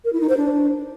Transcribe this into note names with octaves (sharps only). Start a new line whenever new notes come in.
A#4
E4
D#4
C5
D4